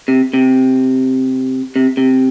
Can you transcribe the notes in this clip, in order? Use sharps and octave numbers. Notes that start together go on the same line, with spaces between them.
C3
C3
C3
C3